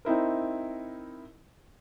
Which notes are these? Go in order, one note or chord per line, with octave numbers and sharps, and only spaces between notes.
C4 D#4 E4 A#4